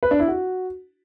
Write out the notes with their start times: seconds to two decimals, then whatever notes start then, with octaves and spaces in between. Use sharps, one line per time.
0.03 B4
0.11 D4
0.19 E4
0.28 F#4